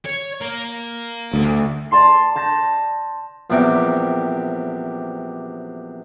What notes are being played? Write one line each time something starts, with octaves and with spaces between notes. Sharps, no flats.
C#5
A#3
D2
D5 A5 C6 C7
A5 G6 A#6
A#1 E2 C3 G3 G4 A#4